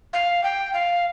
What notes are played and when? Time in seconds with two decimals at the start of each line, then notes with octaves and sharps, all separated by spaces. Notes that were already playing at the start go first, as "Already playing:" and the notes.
0.13 F5
0.43 G5
0.74 F5